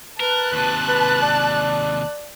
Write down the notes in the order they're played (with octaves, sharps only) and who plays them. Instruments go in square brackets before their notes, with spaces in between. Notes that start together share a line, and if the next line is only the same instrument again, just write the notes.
[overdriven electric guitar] A#4 [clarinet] B4 [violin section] A5 F#6
[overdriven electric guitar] D#2 C3
[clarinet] B4
D5